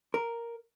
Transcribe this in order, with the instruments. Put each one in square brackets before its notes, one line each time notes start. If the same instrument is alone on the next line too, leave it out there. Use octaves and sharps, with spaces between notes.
[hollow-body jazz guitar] A#4